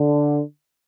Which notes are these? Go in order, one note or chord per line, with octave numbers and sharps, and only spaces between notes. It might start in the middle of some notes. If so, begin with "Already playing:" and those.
Already playing: D3